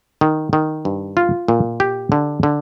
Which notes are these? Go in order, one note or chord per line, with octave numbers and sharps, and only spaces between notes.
D#3
D#3
G2
F4
A#2
G4
D3
D3